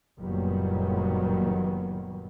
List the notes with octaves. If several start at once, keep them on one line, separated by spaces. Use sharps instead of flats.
F#1 A#2 D#3 F#3 G3 B3